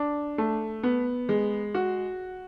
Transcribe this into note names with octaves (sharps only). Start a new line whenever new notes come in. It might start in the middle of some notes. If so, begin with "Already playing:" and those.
Already playing: D4
A3
B3
G#3
F#4